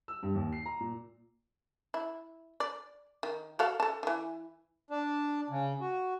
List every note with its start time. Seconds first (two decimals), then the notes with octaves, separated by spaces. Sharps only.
0.08 E6
0.23 G2
0.35 D#2
0.53 C7
0.66 A#5
0.80 A#2
1.94 E4
2.60 D5
3.23 D#3
3.59 F#4 A4 F5
3.80 A4 A5
4.03 D#3 E3
4.90 D4
5.50 C#3
5.81 F#4